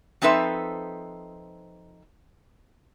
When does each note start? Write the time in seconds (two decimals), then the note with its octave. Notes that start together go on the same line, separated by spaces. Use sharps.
0.22 F3 C4 D#4 A4 B4 E5